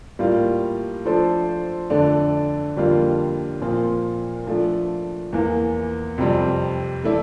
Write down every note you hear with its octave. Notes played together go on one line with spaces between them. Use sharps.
A2 G3 A#3 F4
F3 A3 D4 A4 C5
F2 D3 A3 D4 A4
F2 D3 G3 A#3 F4
A#2 F3 C4 F4
F3 A3 D4
E2 E3 A#3
F2 C3 G3 C4
E3 A3 E4 A4 D5